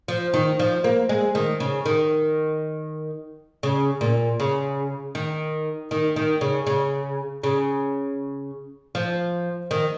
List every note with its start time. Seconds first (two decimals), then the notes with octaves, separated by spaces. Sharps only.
0.08 F3
0.34 D#3
0.59 F3
0.84 A#3
1.09 G#3
1.35 D#3
1.60 C#3
1.86 D#3
3.63 C#3
4.01 A#2
4.40 C#3
5.15 D#3
5.91 D#3
6.16 D#3
6.41 C#3
6.67 C#3
7.43 C#3
8.95 F3
9.71 D#3